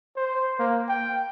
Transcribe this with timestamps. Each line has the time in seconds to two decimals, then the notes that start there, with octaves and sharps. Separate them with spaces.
0.16 C5
0.59 A#3
0.88 G5